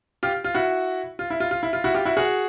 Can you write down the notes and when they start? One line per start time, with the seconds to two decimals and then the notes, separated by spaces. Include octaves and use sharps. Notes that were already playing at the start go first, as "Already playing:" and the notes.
0.23 F4 G4
0.44 F4
0.55 E4 F#4
1.19 F4
1.30 E4
1.40 F4
1.51 F4
1.63 E4
1.73 F4
1.84 E4 F#4
1.94 F4 G4
2.05 E4 F#4
2.17 F#4 G#4